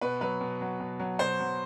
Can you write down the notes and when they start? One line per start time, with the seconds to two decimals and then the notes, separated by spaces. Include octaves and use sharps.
0.01 B2 B4
0.21 F#3 B4
0.41 B2
0.61 F#3
0.80 B2
0.99 F#3
1.19 B2 C5
1.40 F#3